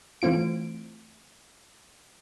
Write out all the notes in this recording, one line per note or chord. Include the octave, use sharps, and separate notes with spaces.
E3 A3 C4 F4 D7